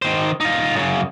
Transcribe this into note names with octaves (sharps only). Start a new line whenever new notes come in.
D#3 C5
D#4 F4
F#2 C#3